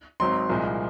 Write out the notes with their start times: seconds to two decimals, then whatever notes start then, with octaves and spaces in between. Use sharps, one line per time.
0.20 G#1 G#2 F#3 C4 D#4 C6
0.49 C2 A#2 F3 G#3